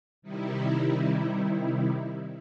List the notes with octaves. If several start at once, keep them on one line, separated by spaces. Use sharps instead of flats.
C3 D#3 G3 D#4 E4